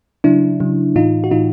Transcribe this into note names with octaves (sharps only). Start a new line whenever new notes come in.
C#3 F#3 D4 E4
C#3 F#3
A2 E3 D#4 F4
F#4
A2 E3 D#4 F4